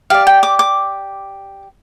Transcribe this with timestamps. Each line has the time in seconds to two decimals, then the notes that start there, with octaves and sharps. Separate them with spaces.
0.10 G4 D5 F5
0.27 G5
0.43 D6
0.59 D6